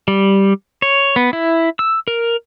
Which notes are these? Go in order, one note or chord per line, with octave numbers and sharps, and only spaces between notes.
G3
C#5
B3
E4
E6
A#4